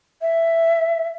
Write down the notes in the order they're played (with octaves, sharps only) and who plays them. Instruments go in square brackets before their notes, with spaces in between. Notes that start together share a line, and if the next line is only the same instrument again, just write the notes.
[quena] E5